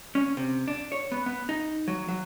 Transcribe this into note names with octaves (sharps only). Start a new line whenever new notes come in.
C#4
C3
D4
C#5
B3
B3
D#4
F#3
F#3